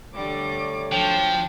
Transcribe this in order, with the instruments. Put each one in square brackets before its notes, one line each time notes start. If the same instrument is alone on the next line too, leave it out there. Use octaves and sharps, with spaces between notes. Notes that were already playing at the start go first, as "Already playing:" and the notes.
[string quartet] D3 G3 D6 [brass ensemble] A3 C#5
[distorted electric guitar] F3 [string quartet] F#3 D4 [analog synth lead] G5